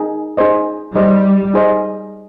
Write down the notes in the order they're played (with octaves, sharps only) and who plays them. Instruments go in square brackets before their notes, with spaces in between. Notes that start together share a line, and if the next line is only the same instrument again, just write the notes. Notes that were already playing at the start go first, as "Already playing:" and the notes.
Already playing: [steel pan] D#4 G#4
D#4 G#4 C5 D#5
[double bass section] G3 [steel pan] D#4 G#4 C5 D#5
[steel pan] D#4 G#4 C5 D#5